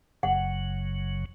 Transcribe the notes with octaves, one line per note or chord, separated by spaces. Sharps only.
F#1 F#2 C#3 F#3 F#5